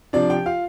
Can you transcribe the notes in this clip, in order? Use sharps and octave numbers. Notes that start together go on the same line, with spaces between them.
C3 F3 D4 D5
G4 G5
F4 F5